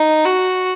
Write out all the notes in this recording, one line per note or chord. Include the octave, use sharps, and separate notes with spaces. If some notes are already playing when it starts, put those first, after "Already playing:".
Already playing: D#4
F#4